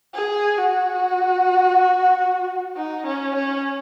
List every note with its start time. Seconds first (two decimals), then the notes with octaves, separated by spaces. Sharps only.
0.14 G#4
0.58 F#4
2.77 D#4
3.06 C#4
3.35 C#4